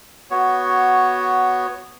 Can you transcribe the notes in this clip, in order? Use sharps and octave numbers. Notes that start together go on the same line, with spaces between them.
B3 F#4 C#5